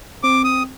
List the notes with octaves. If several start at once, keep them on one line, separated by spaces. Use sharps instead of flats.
C4 D6
D#6